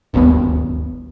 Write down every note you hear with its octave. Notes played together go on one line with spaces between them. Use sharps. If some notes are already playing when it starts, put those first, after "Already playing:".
D1 G1 D#2 B3